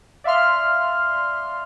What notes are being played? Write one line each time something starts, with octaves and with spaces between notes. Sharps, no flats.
D5 E5 F5 C6 F6